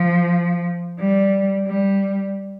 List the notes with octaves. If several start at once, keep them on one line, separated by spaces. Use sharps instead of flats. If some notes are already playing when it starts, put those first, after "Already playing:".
Already playing: F3
G3
G3